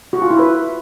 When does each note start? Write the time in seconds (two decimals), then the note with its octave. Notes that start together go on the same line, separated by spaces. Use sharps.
0.13 F#4
0.22 F4
0.31 E4
0.39 B4